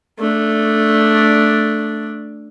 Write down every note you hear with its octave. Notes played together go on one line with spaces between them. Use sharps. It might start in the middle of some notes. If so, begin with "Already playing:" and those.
A3 D4